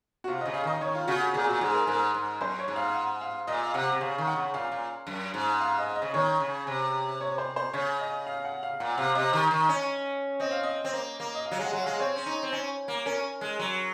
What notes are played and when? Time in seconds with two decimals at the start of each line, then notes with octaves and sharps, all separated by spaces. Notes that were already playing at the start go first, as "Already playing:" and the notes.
0.24 F#4
0.28 C3 F4
0.41 C#3 D#5
0.54 F5
0.63 D#3 D#5
0.81 D#3 C#5
0.95 F4
1.07 C#3 F#4
1.21 F#4
1.34 A#2 G#4
1.48 A#2 F#4
1.61 G#2 G#4
1.74 A#4
1.87 G#2 A#4
2.14 G#2
2.41 F#2 C5
2.59 C#5
2.68 G#2
2.76 F5
2.94 F#5
3.21 F5
3.47 A#2 D#5
3.60 D#5
3.67 F5
3.74 C3 F#5
3.92 C3
4.01 C#3 F5
4.18 D#3
4.27 F#5
4.36 C#3
4.54 A#2 F5
4.72 A#2
5.07 F#2
5.34 G#2
5.61 F5
5.78 D#5
5.95 D#5
6.02 C#3
6.14 D#3 C#5
6.40 C#3
6.67 C3
7.21 C#5
7.38 C5
7.56 C5
7.73 C#3 C#5
8.00 D#5
8.27 F5
8.45 F#5
8.63 F5
8.80 A#2 F#5
8.97 C3 F5
9.15 C3 D#5
9.33 D#3
9.51 D#3
9.69 C#4
10.40 C4 D#5
10.51 F5
10.63 D#5
10.85 C4
10.93 A#3
11.20 A#3
11.35 D#5
11.46 F5
11.51 F#3
11.60 G#3
11.65 F#5
11.73 F#3
11.82 G#3 F5
11.99 C4 C#5
12.16 C#4
12.26 D#4
12.43 C4
12.53 C#4
12.88 A#3
13.06 C#4 A#4
13.41 G#3
13.59 F#3